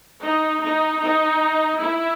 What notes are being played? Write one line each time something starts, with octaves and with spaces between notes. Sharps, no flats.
D#4
D#4
D#4
E4